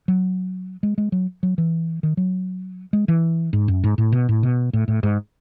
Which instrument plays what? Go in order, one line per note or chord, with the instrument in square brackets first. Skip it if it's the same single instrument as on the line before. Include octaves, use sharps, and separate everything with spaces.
[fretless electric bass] F#3
G#3
G#3
F#3
F#3
E3
D#3
F#3
G#3
E3
G#2
F#2
G#2
A2
B2
A2
B2
A2
A2
G#2